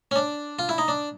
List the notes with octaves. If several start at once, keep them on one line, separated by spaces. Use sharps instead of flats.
C#4
D4
F4
E4
D#4
D4